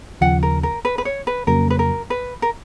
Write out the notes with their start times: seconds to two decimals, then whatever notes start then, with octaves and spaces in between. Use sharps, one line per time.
0.21 D#2 C#3 F3 F#5
0.43 A#4
0.63 A#4
0.85 B4
0.98 B4
1.05 C#5
1.27 B4
1.47 F2 C#3 F#3 A#3 A#4
1.70 B4
1.79 A#4
2.10 B4
2.42 A#4